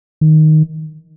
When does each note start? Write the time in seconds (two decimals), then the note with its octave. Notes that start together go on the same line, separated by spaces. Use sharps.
0.21 D#3